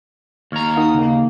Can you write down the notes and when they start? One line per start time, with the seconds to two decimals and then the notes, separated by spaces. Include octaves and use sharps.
0.52 D#2 A#5 C#6 F6 G#6
0.75 D#3 F5 F#5 D#6
0.95 C#3 A#3